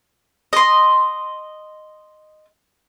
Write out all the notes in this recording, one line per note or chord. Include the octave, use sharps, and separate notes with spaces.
D#5 C6